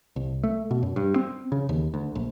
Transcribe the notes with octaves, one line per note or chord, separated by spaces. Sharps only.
C2
A3
B2
F#2
G2
C4
C#3
D#2
D2
A#1